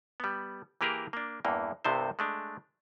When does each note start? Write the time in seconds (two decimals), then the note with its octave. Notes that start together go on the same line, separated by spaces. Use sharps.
0.20 G3 B3
0.81 E3 A#3 G4 G#4 A#4
1.13 A#3 D4
1.45 E2 G2 E3 A#3
1.85 C2 G2 C3 B3 C4 C5
2.19 G#3 A3 D4